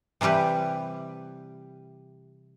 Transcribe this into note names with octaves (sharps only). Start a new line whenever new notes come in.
C3 E3 G3 G4 B4